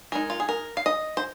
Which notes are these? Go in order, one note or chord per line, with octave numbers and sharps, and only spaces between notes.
G#3 D#4 A#4
F4
G#4
A#4
F5
D#5
C5